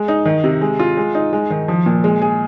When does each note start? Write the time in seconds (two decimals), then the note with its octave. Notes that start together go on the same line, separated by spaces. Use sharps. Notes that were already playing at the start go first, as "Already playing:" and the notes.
Already playing: G#3
0.08 D#4
0.25 D#3
0.44 C3
0.61 G#3
0.79 F4
0.97 G#3
1.15 D#4
1.33 G#3
1.50 D#3
1.68 F3
1.86 A#2
2.04 G#3
2.21 G#4